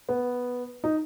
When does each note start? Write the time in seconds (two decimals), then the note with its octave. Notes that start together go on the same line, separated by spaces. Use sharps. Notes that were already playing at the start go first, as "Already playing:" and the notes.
0.09 B3
0.84 D#4